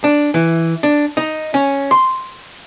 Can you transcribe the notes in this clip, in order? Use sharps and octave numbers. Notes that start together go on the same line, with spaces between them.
D4
E3
D4
D#4
C#4
C6